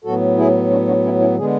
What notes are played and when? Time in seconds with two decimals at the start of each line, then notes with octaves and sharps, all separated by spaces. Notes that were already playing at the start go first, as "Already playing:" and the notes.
0.04 A2 F#3 B3 F#4 A4
0.38 E4 G#4
0.71 D4 F#4
0.87 D4 F#4
1.05 C#4 E4
1.20 C#4 E4
1.38 D3 G#3 B3 G#4